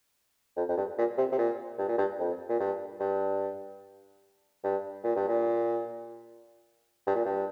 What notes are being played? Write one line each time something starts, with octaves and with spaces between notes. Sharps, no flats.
F2
F2
G2
A#2
C3
C3
A#2
G2
A#2
G2
F2
A#2
G2
G2
G2
A#2
G2
A#2
G2
A#2
G2